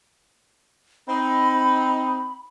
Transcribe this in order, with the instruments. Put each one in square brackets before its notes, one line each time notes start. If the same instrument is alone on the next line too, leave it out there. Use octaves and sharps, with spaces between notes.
[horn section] C4 D#4 [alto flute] B5